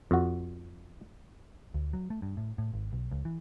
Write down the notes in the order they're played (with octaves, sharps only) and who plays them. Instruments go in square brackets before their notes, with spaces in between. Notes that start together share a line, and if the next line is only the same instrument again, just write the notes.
[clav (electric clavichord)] F2 F#4
[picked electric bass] D2
F#3
A3
G2
A2
A2
G#1
B1
C#2
E3